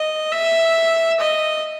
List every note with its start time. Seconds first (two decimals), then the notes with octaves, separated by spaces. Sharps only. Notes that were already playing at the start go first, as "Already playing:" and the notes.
Already playing: D#5
0.32 E5
1.20 D#5